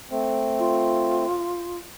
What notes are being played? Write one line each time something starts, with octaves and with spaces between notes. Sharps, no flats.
A3 C4
F4